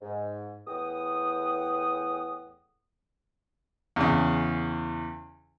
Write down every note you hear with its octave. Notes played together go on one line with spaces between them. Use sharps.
G#2
E2 A2 F#5 G5 D#6
E2 C#3